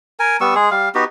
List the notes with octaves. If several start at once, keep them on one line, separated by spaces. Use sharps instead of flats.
A#4 G#5
G3 B3 C#6 E6
G#3 G#4
G3 F5
B3 D#4 F#4 G4